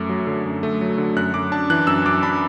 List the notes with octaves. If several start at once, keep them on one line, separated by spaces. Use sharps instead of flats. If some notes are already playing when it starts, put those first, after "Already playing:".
Already playing: F#2 A3 D6
F#3
D3
F#2
A3
F#3
D3
F#2 F#6
F#2 D6
D4 A5
E3 F#6
F#2 E6
F#2 D6
D4 B5